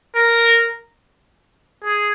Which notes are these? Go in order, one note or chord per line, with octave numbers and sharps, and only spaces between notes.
A#4
G#4